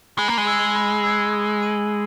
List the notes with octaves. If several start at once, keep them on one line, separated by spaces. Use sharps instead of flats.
G#3 B5
A#3
G#3
E6 G#6
B5
E6 G#6
D#6
G#6 D#7 F#7